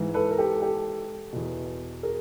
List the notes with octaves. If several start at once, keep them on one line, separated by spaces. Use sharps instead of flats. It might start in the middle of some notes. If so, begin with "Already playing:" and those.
Already playing: G#2 E3
A4 B4
A#4
G4 A4
G4 A4
E2 B2
G#4 A#4